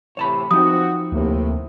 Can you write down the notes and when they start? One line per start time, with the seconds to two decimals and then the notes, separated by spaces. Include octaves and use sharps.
0.17 A2 C3 E3 C#5 A5 B5
0.51 F3 C4 D#4 F#4 D#6
1.12 D2 A2 C3 A#3